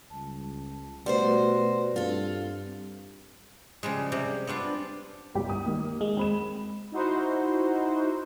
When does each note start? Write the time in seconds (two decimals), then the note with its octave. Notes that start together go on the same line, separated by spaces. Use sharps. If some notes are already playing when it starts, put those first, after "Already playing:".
0.10 C#2 G3 A5
1.06 B2 G3 A3 F#4 B4 C5 C6
1.96 G2 C4 F4 A4
3.83 C#3 F3 G3 G#3
4.12 C3 G3
4.47 B3 C4 D4 F4
5.34 G1 C2 G4
5.50 D#6
5.66 D#3 A#3
6.01 G#3
6.17 C4 B5 E7
6.92 D#4 E4 F#4 C5